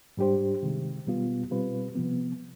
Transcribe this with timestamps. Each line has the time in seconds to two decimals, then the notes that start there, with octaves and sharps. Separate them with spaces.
0.17 G#2 G3 D4 G4 C5
0.63 C3 D#3 G#3
1.07 B2 G3 B3 F4
1.51 B2 G3 C4 F4 B4
1.95 C3 F3 B3